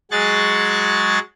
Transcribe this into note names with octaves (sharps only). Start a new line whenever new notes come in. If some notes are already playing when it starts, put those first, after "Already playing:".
F#3 G#3 G#4 C#6 F#6 A6